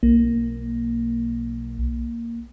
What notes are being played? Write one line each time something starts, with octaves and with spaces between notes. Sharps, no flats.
B1 A#3